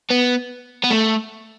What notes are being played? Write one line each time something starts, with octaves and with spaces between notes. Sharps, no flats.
B3
B3
A3